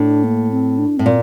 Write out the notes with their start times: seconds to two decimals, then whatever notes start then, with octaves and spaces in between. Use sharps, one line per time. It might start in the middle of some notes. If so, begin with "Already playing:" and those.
Already playing: A2 D4
0.24 A#3
0.51 C4
0.78 D4
0.97 A2 C4
1.06 A#2